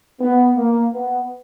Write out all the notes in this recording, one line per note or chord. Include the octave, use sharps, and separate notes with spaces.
B3
A#3
B3